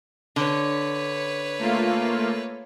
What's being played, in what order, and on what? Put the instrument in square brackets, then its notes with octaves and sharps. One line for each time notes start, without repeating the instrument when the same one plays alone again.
[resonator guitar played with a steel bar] D3 [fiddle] B4 C#5
[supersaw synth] A3 A#3 F4